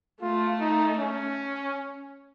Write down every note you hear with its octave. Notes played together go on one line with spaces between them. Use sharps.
A3 F4
D#4
C#4